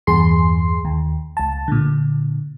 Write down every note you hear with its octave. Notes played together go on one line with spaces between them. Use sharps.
E2 G2 G#4 C6 C7
D#2
C#2 A5
A#2 D3